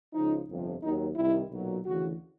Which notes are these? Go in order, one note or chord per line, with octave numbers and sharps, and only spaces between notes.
C#2 C#3 F3 D#4
G1 F2 C3 F3
D#2 D#3 F#3 D#4
C2 C3 D#3 G3 E4
B1 A#2 F#3
D2 C#3 E3 F#4